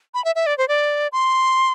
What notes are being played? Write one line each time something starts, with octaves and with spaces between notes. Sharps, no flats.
B5
E5
E5
D5
C5
D5
C6